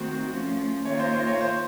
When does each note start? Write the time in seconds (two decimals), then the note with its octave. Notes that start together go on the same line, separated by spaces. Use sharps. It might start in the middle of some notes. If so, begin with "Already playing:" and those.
Already playing: D#3 A3 C4 F#4 C5
0.30 F3 A3 C#4
0.85 D#3 A#3 F4 A#4 C#5
1.00 C5
1.13 C5
1.27 C#5
1.41 C5